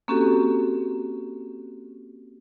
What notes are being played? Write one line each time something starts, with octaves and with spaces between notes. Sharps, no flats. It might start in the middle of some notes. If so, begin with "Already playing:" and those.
A#3 C4 C#4 F#4 G4 A4